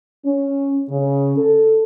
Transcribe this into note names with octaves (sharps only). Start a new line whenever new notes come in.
C#4
C#3
A4